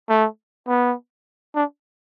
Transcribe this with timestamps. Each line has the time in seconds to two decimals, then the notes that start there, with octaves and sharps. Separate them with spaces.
0.09 A3
0.68 B3
1.55 D4